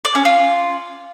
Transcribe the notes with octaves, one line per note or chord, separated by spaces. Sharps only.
D5
C#4
F4